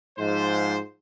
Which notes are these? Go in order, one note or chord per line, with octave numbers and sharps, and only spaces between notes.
G#2 F3 C5